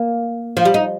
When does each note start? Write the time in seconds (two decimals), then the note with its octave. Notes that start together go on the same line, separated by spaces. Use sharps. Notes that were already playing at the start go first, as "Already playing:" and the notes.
Already playing: A#3
0.57 F3
0.65 G3
0.74 D#4